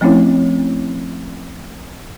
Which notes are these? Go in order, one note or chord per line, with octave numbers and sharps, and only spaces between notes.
F3 A3 C4 C#4 E4 C#5